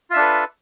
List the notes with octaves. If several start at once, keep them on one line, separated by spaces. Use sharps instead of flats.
D4 F4 A4 B4 E5